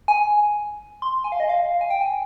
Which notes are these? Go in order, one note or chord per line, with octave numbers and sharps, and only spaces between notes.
G#5
C6
G#5
F5
D#5
F5
G#5
G5
G#5